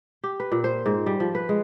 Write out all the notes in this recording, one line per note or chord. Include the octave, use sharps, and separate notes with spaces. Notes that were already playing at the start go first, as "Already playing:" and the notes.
G4
B4
A#2
C5
G#2
G3
F3
B4
G#3